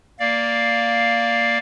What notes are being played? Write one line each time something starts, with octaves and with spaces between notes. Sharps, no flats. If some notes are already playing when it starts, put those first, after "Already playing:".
A#3 D5 F5